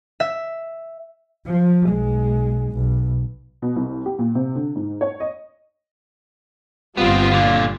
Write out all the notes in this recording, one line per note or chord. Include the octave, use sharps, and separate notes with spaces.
E5
F3
B1 G#3
B1
B2
C2
G4
A#2
C3
D3
G#2
C#5
D#5
G1 G3 B3 C4 F4
A#2 D3